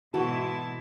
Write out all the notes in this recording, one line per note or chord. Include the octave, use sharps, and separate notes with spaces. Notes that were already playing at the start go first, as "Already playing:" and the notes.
G#2 B2 E3 C4 E4 F#4 A4 A5